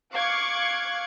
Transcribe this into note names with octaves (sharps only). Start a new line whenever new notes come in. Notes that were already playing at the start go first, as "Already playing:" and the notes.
F5 C#6 D6 F#6 G#6 C#7